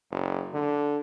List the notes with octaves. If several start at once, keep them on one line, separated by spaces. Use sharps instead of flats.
F#1
D3